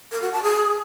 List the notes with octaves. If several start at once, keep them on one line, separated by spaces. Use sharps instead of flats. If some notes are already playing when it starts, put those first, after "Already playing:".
A#4
F#4
A5
G#4